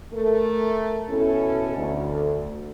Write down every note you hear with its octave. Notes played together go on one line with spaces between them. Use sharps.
A3 A4 A#4
B2 C#4 E4 A4
D2